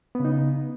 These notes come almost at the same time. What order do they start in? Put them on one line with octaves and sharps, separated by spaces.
B3 C#3 D#4